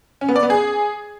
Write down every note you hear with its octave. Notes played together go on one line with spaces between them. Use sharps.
C#4
B3
D5
B3
G#4